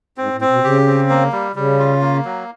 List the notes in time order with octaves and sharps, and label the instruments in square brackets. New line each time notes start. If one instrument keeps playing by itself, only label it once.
[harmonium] G#2 [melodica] C4
[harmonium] A2
[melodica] C4
[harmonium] B2
[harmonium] C#3 [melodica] G4
[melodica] C4
A#3
G3
[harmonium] C#3 [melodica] G3
[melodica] F4
A#3
F#3